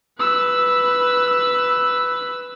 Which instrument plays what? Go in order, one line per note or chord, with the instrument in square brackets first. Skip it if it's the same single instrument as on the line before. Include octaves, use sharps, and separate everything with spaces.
[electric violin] B4 E6